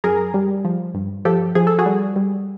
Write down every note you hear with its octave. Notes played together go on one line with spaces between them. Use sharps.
F#2 G#4 A#4
G3
F3
G2
F3 G4 A4
F3 G#4
A4
F#4 G#4
G3
G3